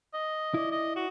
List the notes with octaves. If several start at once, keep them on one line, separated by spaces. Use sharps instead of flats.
D#5
E4 D5
D#5
F#4